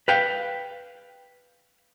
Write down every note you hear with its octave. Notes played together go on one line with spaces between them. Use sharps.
B4 F5 G5